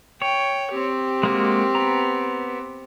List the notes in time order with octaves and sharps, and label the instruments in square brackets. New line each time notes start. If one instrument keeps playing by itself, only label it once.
[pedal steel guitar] C#5 [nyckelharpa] G5
[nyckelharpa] C4 G4
[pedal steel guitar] G#3 A#3 F#4
B3 A#5